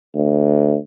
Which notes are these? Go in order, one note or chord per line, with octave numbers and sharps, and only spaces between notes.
D2